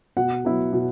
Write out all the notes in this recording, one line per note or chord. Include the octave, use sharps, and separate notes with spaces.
B2 F#5
F#3 B3 E4
B2